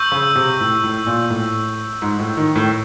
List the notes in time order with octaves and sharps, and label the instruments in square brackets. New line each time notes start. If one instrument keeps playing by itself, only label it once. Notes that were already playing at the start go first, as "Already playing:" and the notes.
Already playing: [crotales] C#6 E6 G6
[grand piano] C#3
C3
A2
A2
A#2
A2
G#2
A2
D#3
A2